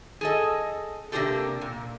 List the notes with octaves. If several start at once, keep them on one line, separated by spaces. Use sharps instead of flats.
G#4 A4 D#5
C3 A#3 D4 F4 G4 A4
A#2